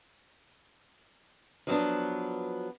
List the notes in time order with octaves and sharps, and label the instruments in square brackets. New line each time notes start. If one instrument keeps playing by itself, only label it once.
[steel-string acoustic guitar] F3 F#3 B3 D4